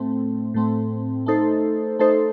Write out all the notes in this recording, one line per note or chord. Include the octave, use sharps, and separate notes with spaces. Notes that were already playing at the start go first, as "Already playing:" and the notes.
Already playing: A2 A3 C4
A2 A3 C4
A3 D#4 A4 C5
A3 D#4 A4 C5